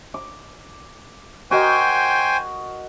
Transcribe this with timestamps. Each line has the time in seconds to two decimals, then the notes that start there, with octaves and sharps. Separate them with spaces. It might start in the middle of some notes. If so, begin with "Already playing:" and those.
0.14 D6
1.51 F#4 A#4 C5 D#5 G5 G#5